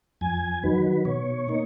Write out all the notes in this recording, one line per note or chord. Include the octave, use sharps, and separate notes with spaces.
F2 G#5
D#3 F#3 B4
B2 C#5
A#3 D#4